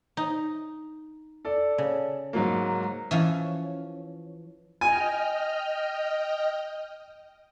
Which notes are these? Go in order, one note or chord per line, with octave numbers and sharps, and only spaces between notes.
D#4
A4 D5
C#3
G#2 F#3 A#3
E3 F3 C#4
D#5 G5 G#5 F6